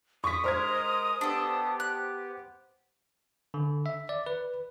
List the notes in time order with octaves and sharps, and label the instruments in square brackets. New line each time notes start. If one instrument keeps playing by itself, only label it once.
[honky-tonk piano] C#6 B6 [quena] D#6
[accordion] G#3 A#4 A#5 [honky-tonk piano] C5 F6 G#6
[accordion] B3 G4 [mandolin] D4 A4
[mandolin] F#6
[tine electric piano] D3
E5
D5
B4